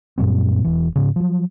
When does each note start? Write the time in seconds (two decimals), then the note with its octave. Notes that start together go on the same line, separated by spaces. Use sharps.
0.18 F#2 A#2 G3 C4
0.64 E1 E3
0.96 G#2 C#3
1.16 F3 F#3